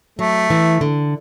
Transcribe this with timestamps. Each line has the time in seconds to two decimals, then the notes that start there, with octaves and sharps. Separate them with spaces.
0.19 F#3 A3
0.50 E3
0.81 D3